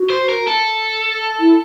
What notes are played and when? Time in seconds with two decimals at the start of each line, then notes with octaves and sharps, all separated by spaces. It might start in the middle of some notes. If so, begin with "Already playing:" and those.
Already playing: F#4
0.10 C5
0.29 A#4
0.48 A4
1.40 E4